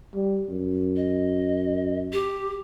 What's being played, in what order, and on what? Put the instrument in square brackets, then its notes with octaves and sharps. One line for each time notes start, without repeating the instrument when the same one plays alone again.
[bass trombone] G3
F#2
[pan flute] D#5
G4